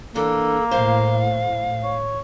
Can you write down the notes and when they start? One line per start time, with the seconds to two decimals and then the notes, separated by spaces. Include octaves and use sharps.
0.15 E3 A#3 D4 A4
0.71 A2 C5 F5
1.83 C#5